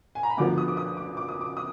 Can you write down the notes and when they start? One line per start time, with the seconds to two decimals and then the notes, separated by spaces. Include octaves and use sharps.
0.15 G#5
0.23 A#5
0.30 B5
0.37 D2 D3 F3 B3 D6
0.58 D#6
0.68 D6
0.77 D#6
0.97 D6
1.17 D6
1.29 D#6
1.41 D6
1.57 D#6